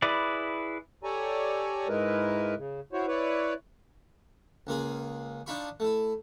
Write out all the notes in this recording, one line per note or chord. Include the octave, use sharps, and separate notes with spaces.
E4 G#4 B4 D5
G4 A4 C#5 D5 G#5 A#5
G#2 G#3 E4 A#4 B4
C#3
E4 F#4 C5 C#5
E4 B4 C#5 D5
C#2 A#3 F4 G#4
D4 D#4 F4 B5 C#6
A3 E4